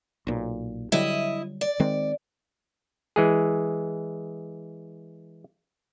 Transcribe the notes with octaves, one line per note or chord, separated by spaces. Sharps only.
B1 A#2
D3 F#3 G3 E4 D#5
D5
D#3 G#3 C4
E3 G#3 G#4